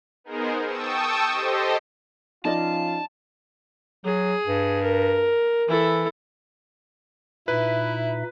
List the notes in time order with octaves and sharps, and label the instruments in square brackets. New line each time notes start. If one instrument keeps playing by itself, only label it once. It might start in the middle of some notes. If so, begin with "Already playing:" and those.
[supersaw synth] B3 D#4 G#4 A#4 C5
G5 A5 C#6 D#6 E6
G4 A4 C5 D#5
[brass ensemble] F3 C#4 F4 [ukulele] D#4 D5 D#5 [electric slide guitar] A5
[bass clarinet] F#3 [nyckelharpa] G#4
[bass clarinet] G2
[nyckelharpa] A#4
[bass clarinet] E3 [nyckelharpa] E4 A4
[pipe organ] A#2 D#4 E5 [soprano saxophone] E4 [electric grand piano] B4